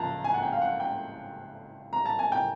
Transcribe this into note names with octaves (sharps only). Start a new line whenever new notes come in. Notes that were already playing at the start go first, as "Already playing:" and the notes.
Already playing: C#2 F3 A5 A#5
G#5
F#5
G5
F5
F#5
G5
A#5
A5
G#5
G5